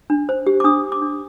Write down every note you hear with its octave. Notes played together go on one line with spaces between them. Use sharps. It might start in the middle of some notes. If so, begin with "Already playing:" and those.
D4
C5
G4
D6
D4 D#6
G4
D6
D4